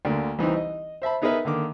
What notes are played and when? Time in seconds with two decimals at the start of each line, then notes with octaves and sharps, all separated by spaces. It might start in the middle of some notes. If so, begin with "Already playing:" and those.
0.05 D2 D3 A#3 D5
0.39 C2 E3 C4 D#4
0.56 D#5
1.02 C5 E5 A5 B5
1.22 B3 D#4 G#4 A#4 B4 E5
1.45 D3 D#3 A#3 D6